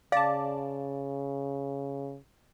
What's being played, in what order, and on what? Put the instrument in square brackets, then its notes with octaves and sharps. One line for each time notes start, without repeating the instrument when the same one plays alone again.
[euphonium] C#3 [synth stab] D5 A5 [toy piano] F5